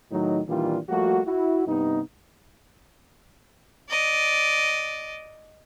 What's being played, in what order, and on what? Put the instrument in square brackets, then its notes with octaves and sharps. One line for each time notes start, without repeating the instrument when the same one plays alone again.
[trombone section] A2 D#3 F#3 D#4
A#2 D#3 E3 G3 D4 F4
F3 G3 A3 A#3 F#4
E4 F#4
G2 C3 B3 D#4
[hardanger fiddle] D5 D#5